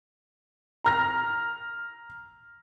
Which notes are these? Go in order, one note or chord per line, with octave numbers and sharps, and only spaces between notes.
A#5 F6 A#6